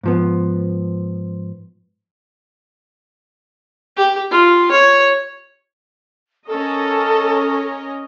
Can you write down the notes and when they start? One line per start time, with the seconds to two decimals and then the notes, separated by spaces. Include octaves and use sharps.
0.03 G#2 F3 B3
3.97 G4
4.31 F4
4.72 C#5
6.47 C#4 A4 A#4 D#5